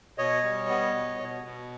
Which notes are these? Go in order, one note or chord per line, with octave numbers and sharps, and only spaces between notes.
B2 C#5 D#5
G3
B3
B2
B2
B2